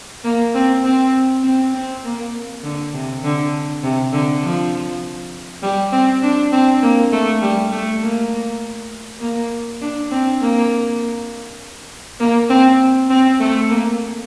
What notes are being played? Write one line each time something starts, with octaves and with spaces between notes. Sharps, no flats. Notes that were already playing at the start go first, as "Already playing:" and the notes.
A#3
C4
C4
C4
C4
A#3
D3
C3
D3
C3
D3
F3
G3
C4
D4
C4
A#3
A3
G3
A3
A#3
A#3
D4
C4
A#3
A#3
C4
C4
A3
A#3